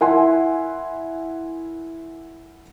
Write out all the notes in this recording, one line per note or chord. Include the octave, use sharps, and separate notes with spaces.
E4 A#4 F#5 G#5 C6